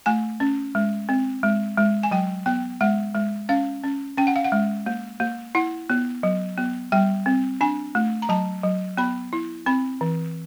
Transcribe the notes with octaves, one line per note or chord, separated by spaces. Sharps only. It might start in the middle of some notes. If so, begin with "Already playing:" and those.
A3 G#5
C#4
G#3
C4
G#3
G#3
G#5
F#3 G5
B3 G5
G#3 F#5
G#3
C#4 F5
C#4
C#4 G5
F#5
F5
F#5
G#3
A#3
A#3
E4 F#5
B3
F#3
B3
G3 G5
C4
D4 G#5
A3
A#5
F#3 A5
F#3
B3 B5
E4
C4 B5
E3